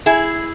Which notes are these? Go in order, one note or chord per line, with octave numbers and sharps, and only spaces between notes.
E4 G#4